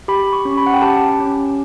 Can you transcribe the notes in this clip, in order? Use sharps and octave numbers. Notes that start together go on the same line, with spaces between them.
G4 B5
C#6
C#4
B5
F#5
G5
G4 A5
C#4